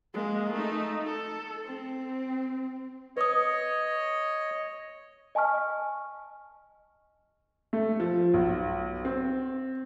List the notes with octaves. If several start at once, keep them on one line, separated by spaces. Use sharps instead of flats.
G#3 A#3
A3 D#4
A4
C4
B4 C#5 D#5 D#6
D#5 G#5 A5 C#6 F6
A3
F3
B1
C4